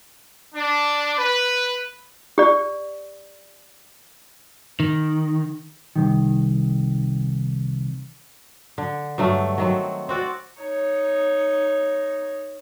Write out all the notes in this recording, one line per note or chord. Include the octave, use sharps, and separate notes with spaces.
D4
B4
G4 D5
D#3
C2 D#3
D3
G2 F#3 A3
D#3 F#3 C4
C4 F#4 D5
D#4 C#5